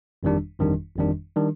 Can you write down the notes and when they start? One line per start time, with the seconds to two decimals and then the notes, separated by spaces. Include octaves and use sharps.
0.23 G1 F2 D#3 G3 D4
0.60 G1 F2 D#3 G3 D4
0.97 G1 F2 D#3 G3 D4
1.36 D#3 G3 D4